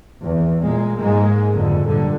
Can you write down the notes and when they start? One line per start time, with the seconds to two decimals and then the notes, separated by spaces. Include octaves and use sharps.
0.21 E2
0.61 A#2 G#3 A#3
0.97 G#2 G#3 A#3
1.52 F#1 F2 D3
1.85 G2 A#2 D3